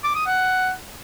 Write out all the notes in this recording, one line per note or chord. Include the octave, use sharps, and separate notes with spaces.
D6
D#6
F#5